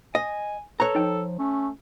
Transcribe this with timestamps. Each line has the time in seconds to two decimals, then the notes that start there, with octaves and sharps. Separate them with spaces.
0.15 D#5 G#5
0.80 A4 B4 C#5 A#5
0.95 F3 D#4 G5
1.39 A3 C#4